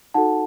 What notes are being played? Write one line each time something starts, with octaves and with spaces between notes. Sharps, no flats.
D#4 F#4 A4 F#5 A5